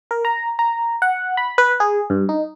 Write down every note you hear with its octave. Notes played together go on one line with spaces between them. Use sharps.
A#4
A#5
A#5
F#5
B5
B4
G#4
G2
D#4